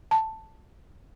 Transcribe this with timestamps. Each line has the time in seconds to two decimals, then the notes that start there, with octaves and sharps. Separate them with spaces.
0.11 A5